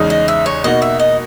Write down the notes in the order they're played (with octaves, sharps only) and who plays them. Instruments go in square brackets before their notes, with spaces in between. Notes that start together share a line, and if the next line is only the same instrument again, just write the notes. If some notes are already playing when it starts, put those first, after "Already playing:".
Already playing: [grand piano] E2 C#3 G#3 D#4
[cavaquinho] D#5
E5
C#5
[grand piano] B2 A#3 D#4 F#4 [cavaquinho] D#5
[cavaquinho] E5
D#5